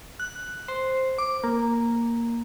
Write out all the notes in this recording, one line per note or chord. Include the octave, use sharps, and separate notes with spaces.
F#6
C5
D6
A#3